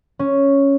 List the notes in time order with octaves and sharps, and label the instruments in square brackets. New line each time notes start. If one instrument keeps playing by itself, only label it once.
[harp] C#4